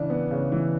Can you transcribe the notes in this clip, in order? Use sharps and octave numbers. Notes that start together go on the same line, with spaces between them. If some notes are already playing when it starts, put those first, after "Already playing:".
Already playing: C#3 E3 D4
B3
C#3
E3